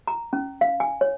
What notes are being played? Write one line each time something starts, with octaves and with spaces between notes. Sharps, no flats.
A#5
C#4
F5
G#5
C#5